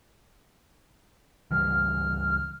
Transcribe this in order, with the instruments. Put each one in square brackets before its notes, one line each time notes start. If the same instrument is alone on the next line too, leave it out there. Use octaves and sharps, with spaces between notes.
[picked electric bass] C#2 E3 G3 [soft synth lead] F6